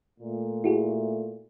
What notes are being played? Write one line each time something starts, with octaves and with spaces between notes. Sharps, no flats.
A#2 A3
E4 F#4 G#4